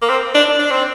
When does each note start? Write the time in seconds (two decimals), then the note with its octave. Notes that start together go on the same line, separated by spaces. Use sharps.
0.02 A#3
0.09 C4
0.35 D4
0.59 D4
0.71 C4